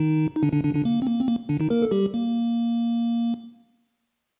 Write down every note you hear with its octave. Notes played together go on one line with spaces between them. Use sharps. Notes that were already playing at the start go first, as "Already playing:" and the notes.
Already playing: D#3 D#4
D#4
D3 D4
D3 D4
D3 D4
D3 D4
A#3
C4
A#3
C4
A#3
D3 D4
D#3 D#4
A#3 A#4
A4
G3 G4
A#3